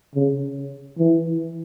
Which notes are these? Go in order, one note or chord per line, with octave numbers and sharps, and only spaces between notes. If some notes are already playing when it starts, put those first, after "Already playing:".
C#3
E3